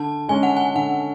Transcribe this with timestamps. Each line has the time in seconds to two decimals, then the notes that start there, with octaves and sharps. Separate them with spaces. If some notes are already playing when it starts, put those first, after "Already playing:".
Already playing: D3 A5
0.29 G#3 C#4 G#5
0.43 F#5
0.57 G#5
0.75 D3 F#5